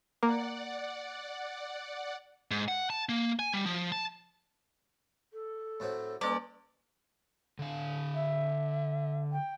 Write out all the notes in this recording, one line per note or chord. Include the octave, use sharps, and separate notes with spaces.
A#3 D5 F#5
G#2
F#5
A5
A#3
G#5
G3
F3
A5
A4
A2 F#3 C4
G3 A#3 C#4 A4 B4 D5 A#5
D3 F5
E5
G5